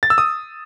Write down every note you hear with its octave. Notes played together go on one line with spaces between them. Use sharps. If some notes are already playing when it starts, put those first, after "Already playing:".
A6
E6
D#6